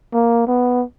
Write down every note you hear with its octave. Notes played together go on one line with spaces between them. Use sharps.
A#3
B3